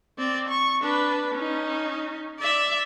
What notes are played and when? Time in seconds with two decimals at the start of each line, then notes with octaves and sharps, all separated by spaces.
0.18 C4 D5
0.49 C#6
0.82 D4 B4
1.34 C#4 D#4
2.39 D5 E5